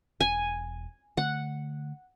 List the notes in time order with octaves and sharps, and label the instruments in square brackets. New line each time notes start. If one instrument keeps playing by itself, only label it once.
[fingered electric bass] E1 [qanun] G#5
[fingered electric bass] D3 A3 [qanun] F#5